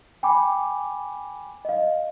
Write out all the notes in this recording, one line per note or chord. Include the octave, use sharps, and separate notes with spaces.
G5 G#5 B5 D6
D#5 F5